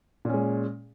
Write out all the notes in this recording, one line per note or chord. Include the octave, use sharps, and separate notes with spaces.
A#2 G#3 C#4